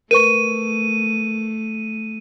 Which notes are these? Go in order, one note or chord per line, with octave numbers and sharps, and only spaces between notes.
A3 A#4 B4 C#6 D#7